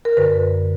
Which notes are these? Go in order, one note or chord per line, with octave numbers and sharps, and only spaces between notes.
A#4
F#2 D3 B4